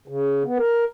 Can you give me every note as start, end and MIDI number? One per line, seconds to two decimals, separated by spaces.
0.08 0.43 49
0.45 0.58 59
0.58 0.84 70